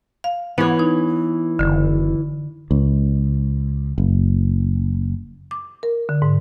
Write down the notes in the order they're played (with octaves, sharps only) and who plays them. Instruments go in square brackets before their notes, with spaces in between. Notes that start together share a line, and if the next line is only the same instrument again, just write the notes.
[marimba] F5
[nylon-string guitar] E3 C#5 [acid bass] B3
[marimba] D#4
[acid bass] F#1 [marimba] D3
[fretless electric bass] C#2
F#1
[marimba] D6
A#4
D3
G#2